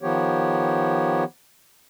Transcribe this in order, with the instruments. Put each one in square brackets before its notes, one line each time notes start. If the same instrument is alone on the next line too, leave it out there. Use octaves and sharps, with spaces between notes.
[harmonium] D#3 F3 B3 G4 C#5